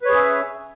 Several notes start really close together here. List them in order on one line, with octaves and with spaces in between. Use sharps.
B4 C#5 G#4 C#4 E5